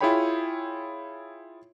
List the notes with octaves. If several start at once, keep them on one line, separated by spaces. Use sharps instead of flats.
E4 F4 G#4 C#5 G5 B5